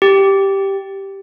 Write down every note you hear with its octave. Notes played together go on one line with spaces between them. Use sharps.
G4